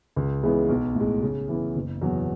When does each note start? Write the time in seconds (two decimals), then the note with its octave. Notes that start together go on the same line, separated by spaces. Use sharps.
0.16 C#2
0.43 C#3 E3 G#3 B3
0.69 B1
0.95 A2
1.00 G#3
1.22 C#3
1.48 E3 B3
1.75 F#1
2.01 E2 B2 F#3